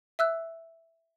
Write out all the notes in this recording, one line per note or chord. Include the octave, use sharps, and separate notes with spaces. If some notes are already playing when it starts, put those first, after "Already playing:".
E5 E6 F#6